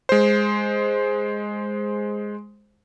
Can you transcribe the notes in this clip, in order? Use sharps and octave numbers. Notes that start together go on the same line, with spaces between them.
G#3 C5